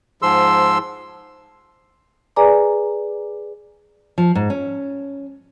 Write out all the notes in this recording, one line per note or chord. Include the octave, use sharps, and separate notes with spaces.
G#2 F3 C6 E6
G#4 B4 D5 G#5 A#5 D6
F3
G#2
C#4